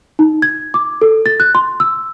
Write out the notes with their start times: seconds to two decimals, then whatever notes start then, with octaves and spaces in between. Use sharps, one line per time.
0.19 D#4
0.42 G#6
0.74 D6
1.02 A4
1.26 A6
1.40 F#6
1.55 C6
1.80 E6